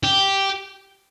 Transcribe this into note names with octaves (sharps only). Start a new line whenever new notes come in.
G4